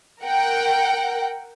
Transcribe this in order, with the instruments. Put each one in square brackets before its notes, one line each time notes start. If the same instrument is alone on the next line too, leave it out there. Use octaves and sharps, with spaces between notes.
[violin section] A#4 F#5 G5